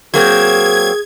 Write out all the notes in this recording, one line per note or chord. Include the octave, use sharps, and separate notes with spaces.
F#3 A#3 C4 G#4 G#6